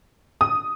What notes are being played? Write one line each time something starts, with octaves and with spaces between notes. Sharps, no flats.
D#6